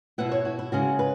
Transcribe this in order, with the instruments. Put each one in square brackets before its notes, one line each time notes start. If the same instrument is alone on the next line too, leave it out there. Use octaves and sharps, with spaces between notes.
[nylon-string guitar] B2 B3 E4 F#5
C#5
F#4
E4
C#3 G#3 C#4 F#4
B4